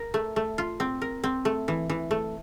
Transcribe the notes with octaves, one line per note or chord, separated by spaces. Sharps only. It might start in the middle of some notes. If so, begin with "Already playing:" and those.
Already playing: A#4
A3
A3
F4
C4
A#4
C4
A3
E3
E3
A3